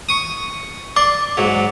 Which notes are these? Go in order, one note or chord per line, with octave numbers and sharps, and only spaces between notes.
C#6 D#6
D5 D6
G#2 F#3